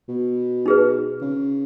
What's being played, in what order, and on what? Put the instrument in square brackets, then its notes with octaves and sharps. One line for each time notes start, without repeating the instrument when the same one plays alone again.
[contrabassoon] B2
[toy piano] D#4 G#4 B4
[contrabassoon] C#3